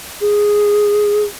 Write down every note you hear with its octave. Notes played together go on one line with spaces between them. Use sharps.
G#4